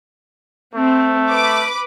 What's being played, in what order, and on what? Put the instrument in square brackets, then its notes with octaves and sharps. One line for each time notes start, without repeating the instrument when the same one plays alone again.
[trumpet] A3 [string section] C4
[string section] B4 D6